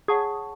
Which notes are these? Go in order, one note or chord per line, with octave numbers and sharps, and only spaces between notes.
G#4 C#5 F#5 A5 C#6